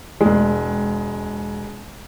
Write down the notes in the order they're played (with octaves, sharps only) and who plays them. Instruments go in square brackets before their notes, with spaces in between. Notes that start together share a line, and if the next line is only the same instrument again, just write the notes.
[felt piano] E1 G#3